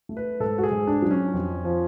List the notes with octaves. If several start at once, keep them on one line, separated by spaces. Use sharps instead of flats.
A3
B4
G#2 A4
F#4
G#4
G#2
D4
F#3 D4
C#4
F2
F3